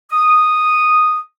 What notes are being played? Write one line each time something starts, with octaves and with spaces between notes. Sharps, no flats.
D#6